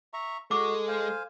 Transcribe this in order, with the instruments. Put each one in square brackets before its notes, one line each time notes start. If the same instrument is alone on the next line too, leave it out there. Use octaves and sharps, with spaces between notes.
[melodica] E5 A#5 C#6
[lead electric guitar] G#3 [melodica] F#4 [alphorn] A4 [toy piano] D6
[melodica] C5 F5 G#5